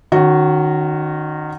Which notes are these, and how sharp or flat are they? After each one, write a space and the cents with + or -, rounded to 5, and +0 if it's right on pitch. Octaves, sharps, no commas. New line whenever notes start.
D#3 -25 C#4 +0 F#4 +0